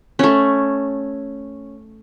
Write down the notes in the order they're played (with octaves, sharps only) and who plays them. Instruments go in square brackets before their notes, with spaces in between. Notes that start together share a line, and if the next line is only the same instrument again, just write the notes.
[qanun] A3 C#4